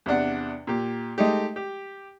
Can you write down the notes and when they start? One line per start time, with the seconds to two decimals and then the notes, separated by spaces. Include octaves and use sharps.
0.06 E2 C3 D4 F#5
0.67 A#2 G4
1.18 G#3 A3 D#4 G4
1.56 G4